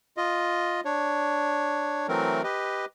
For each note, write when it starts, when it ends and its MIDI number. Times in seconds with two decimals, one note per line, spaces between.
0.17 0.81 65
0.17 0.81 75
0.85 2.07 62
0.85 2.07 73
2.08 2.42 52
2.08 2.42 54
2.08 2.42 57
2.08 2.42 60
2.08 2.42 70
2.44 2.85 67
2.44 2.85 71
2.44 2.85 75